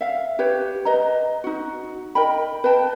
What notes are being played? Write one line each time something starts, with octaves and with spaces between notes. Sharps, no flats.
E5 F5
G4 B4 C#5
B4 D#5 A#5
D#4 F#4
A#4 D#5 G5 B5
B4 D#5 G5 A5